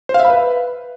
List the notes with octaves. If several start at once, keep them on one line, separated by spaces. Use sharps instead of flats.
C5
F5
E5
B5
B4